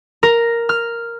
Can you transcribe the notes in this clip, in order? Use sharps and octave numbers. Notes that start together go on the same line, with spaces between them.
A#4
F6